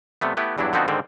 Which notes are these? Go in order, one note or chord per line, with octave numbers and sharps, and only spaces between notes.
C3 G3 A3 B3
A3 B3 E4 G4 B4
E2 G2 F#3 D4 E4
D3 F3 B3 C4 D#4 F#4
G#2 D3 D#3 C4